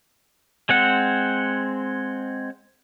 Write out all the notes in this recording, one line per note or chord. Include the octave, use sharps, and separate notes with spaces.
G#3 C4 F#5